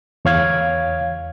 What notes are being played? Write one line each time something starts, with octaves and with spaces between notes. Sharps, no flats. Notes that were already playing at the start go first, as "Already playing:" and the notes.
E2 C#5 F5 G#6